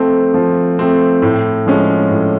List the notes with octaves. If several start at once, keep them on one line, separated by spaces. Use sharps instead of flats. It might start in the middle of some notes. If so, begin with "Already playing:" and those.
Already playing: F3 A3 C4
F3
A3 C4
A2
F3 G#3 C#4
A2